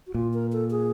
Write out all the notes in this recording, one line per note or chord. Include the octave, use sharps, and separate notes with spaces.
F#4
A#2 F4
A#4
A4
G#4